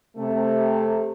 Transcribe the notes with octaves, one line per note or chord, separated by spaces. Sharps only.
C3 A3